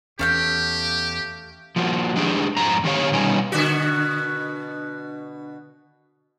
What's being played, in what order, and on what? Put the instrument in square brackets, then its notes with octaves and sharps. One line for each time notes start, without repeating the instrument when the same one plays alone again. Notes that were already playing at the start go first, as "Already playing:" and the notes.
[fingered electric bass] E2 C#4 [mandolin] A3 F5 G5 [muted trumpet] G4
[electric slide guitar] F3 A#3 F#4
G#3 D4 G4 G#4
F2 G#2 A#5
D3 D#3 G4 C#5 F5
B2 G3 C#4 D#4 B4
[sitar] B2 D3 F#4